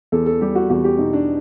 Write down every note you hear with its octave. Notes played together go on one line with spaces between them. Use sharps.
E2 A4
A4
G3 G4
F#4
E2 F#4
G4
B2 D#4
D4